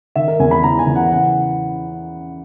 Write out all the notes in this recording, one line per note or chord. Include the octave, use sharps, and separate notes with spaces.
D#3 E5
A#4
E2 G#5
B5
E3 A#5
G#5
E3
F#5
C#3 F#5